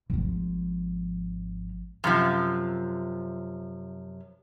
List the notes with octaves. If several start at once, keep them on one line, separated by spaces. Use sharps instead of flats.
G#1 F3
F#2 C3 F3